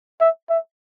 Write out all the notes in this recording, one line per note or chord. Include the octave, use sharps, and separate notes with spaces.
E5
E5